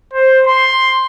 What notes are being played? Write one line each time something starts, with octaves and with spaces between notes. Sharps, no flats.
C5
C6